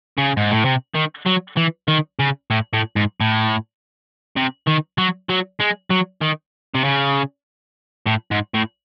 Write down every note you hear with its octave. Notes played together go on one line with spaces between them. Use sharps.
C#3
G#2
A2
C3
D#3
F#3
E3
D#3
C#3
A2
A2
G#2
A2
C3
D#3
F#3
F#3
G#3
F#3
D#3
C3
C#3
A2
G#2
A2